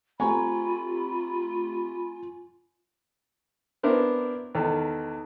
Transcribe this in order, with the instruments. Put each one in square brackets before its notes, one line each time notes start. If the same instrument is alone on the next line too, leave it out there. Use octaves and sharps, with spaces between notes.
[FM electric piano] A3 C4 G4 [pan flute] F4 [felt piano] G#5 A#5 C#6 [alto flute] B5
[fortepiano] B3 C4 D4 E4 A#4 C5
E2 D#3 A4